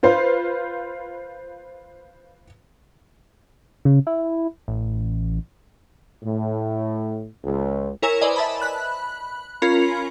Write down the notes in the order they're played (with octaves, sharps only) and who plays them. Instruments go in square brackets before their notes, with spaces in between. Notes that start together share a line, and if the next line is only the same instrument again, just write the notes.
[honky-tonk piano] F4 B4 C5 F5
[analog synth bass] C#3
E4
A1
[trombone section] A2
C#2
[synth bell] E4 A#4 C#5 G#5 E6 E7
B4 C5 D5 D#5 G#5
E5 A5 B5
B5 F#6
C#4 F4 A#4 B5